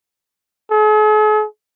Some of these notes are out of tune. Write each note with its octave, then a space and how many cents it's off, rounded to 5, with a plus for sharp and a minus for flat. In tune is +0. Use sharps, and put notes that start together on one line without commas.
G#4 +45